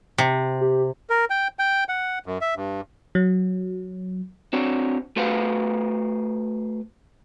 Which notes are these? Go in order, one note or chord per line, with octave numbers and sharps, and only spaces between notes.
C3
G4
A#4
G5
G5
F#5
F#2
E5
G2
F#3
C4 D4 F#4 C#5
A3 F#4 B4 C5 F5 F#5